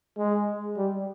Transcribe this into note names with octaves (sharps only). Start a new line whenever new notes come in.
G#3
G3